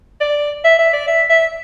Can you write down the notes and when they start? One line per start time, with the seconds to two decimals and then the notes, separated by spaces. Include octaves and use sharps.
0.20 D5
0.64 E5
0.79 E5
0.93 D5
1.07 E5
1.30 E5